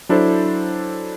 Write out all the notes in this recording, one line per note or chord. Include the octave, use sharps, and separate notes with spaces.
F#3 D4 E4 A4 C5